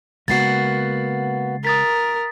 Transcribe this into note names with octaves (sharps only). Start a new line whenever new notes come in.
C#3 G#3 A#3 B3 F#4 A6 C7
A#4 D#6 A6 B6